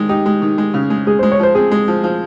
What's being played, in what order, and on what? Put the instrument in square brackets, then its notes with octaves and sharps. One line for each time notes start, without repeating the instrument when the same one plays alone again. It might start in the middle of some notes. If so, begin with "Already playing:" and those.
Already playing: [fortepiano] D#3 G#3
[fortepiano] D#4 [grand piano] G4
[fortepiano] G#3
D#3
G#3
C#3
G#3
[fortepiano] G#3 [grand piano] G#4
[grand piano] C5
[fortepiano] G#3
[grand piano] C#5
[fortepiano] F3 [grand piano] C5
[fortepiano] C4 [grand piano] G#4
[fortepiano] G#3
F3
F3